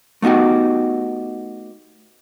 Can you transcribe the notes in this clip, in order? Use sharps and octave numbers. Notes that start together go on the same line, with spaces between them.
A3 B3 D#4 F#4 G4